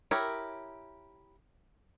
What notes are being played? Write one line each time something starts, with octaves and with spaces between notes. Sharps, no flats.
E4 G4 A#4 C#5